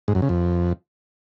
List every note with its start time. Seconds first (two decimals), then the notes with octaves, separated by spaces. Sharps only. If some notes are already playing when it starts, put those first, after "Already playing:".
0.08 G#2
0.15 F#2
0.22 C#3
0.29 F2